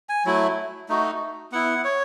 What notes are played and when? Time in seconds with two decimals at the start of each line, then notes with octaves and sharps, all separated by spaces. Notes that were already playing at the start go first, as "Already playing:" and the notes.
0.09 G#5
0.25 F#3 A3 E4
0.89 A3 D#4 F#4
1.52 B3 E4 F#5
1.84 C#5